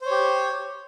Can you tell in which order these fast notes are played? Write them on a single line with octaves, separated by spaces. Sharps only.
C5 C#5 G4